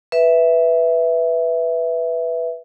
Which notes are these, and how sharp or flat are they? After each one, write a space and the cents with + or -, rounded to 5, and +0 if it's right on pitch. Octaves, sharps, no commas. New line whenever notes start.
B4 +0 E5 +0